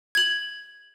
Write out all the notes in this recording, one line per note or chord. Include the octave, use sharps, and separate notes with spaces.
G#6 F#7